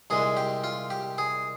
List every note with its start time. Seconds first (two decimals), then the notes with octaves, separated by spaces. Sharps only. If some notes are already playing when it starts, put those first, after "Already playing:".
0.10 C2 A#2 G#3 G#4
0.37 G4
0.64 F4
0.90 G4
1.18 G#4